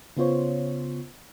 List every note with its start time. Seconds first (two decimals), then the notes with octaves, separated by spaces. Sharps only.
0.17 C#3 B3 F4 C5 C#5